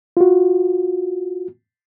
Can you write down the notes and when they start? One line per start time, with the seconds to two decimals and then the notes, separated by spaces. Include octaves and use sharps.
0.17 F4 F#4